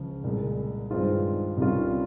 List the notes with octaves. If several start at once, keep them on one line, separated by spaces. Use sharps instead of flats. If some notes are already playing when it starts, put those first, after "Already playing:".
Already playing: C#2 C#3 F3
C2 A#2 G#3
G2 D#3 G#3 C4 F4
C2 C3 G3 C#4 F4